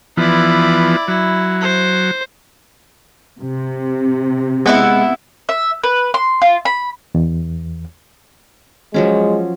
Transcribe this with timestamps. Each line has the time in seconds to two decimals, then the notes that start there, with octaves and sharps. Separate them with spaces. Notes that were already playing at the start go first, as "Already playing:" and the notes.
0.17 E3 F3 B3 E4 D5
1.08 F#3 E4
1.61 C5
3.42 C3
4.66 G#3 B3 E4 F#5
5.49 E5
5.84 B4
6.14 C6
6.42 F4
6.65 B5
7.15 E2
8.94 F3 F#3 G#3 C#4